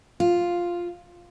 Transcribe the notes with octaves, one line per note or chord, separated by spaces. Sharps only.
F4